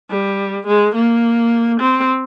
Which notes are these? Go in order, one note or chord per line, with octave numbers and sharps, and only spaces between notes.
G3
G#3
A#3
C4